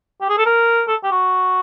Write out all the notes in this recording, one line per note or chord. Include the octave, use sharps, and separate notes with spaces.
G4
G#4
A4
A#4
A4
G4
F#4